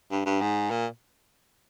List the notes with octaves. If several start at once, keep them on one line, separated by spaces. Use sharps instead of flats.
G2
G2
G#2
A#2